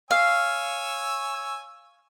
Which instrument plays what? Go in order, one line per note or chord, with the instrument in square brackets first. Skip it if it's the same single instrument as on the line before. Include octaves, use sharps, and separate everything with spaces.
[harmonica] C#5 G#5 E6 [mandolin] F5